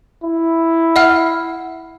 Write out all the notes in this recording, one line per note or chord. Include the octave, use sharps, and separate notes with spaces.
E4
E5 F#5 F6